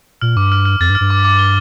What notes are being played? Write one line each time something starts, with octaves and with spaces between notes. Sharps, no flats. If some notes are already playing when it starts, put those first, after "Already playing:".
A#2 F6
G2 D6
F6
F6
F2 A6
G2
F6
G2
D6
D6
G7